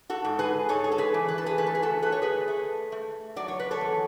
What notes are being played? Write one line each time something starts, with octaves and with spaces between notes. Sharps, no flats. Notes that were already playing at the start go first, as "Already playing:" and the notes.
F#4 A4
G#2
G#4 B4
G#2 A4 C#5
G#4
A4
G#4 B4
E3
B4
A4
G#4 B4
A3 B4
A4
G#4
F#4 A4
A3 B4
C#5
G#4 B4
A3
A3
F#3 D5
C#5
B4
A4 C#5
E2